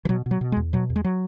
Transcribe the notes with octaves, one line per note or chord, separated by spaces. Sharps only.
E3
B2 F#3
B2
F#3
B2
G#3
E2
B2 F#3
E2
G#3
F#3